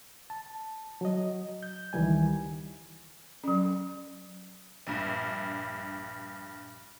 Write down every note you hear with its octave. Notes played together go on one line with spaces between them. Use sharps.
A5
F#3 D#5
G6
C#2 D#3 E3 G3 G#5
F#3 C#4
A#1 G2